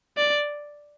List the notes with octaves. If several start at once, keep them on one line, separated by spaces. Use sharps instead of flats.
D5